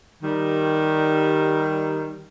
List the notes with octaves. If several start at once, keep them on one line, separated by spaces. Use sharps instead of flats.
D#3 G3